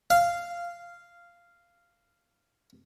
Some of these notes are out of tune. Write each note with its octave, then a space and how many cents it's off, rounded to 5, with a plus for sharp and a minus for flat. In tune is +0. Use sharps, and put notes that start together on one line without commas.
F5 -10